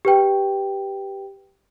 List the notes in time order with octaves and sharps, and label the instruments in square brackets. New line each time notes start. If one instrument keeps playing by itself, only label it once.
[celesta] G4 B4 G5